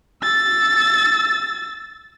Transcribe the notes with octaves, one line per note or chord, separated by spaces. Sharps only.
E6 A6